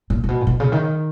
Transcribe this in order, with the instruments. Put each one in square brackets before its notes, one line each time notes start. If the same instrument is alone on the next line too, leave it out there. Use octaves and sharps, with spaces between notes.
[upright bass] A#2
A#2
B2
A#2
B2
C#3
D#3